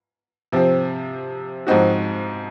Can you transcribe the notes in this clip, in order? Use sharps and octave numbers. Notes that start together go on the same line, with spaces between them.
C3 F3 C4
G#2 F3 C4 D#4 F#4